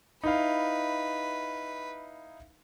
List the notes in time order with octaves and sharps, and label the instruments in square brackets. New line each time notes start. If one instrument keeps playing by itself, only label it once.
[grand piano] D#4 E4 F5 [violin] B4